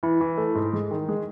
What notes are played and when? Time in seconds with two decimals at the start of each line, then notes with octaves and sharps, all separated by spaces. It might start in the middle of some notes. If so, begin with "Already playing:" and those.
0.03 E3 E4
0.21 E3
0.37 A3
0.55 G#2
0.73 G#3
0.91 D#3
1.09 G#3